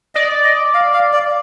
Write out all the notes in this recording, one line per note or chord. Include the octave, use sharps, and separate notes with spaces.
D5 D#5
D#5
F5
F5
D5